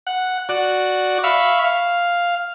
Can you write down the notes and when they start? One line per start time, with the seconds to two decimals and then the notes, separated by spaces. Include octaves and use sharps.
0.07 F#5
0.49 F#4 D5
1.24 E5 F5 B5 C#6
1.64 F5